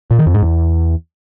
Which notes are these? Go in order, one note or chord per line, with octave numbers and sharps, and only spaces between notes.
A#2
D#3
F2
G#2
E2